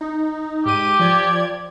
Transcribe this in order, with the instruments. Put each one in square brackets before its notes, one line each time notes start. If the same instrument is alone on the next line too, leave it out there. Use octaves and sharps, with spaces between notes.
[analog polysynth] D#4
[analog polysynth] G#2 D#7 [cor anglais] G4
[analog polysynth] F3 D5 G#6